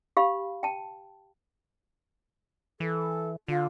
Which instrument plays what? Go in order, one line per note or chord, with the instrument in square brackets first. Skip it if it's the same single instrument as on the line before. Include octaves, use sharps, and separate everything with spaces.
[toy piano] G4 F5 B5
G5 A5
[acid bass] E3 [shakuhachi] A4
[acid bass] D3 [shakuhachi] F4